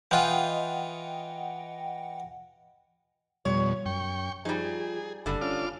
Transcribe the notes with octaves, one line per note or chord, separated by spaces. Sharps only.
E3 F4 D#5 F#5 G5
F2 B2 G3 C#5
F#2 G5 C#6
F3 G3 D#4 G#4
F#1 D3 G3
C#4 F4 D6 F6